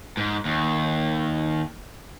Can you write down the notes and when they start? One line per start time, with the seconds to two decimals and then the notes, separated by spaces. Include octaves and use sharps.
0.17 G#2
0.45 D#2